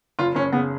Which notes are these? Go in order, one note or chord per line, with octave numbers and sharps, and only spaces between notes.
F#1 F4
F#1 C#4
C#3 B3